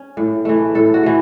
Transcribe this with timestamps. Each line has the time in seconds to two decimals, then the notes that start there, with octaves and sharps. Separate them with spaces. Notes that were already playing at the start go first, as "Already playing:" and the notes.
Already playing: C#4
0.17 A2
0.45 E3 A3
0.75 A2 A4
0.94 F#4
1.03 E3 A3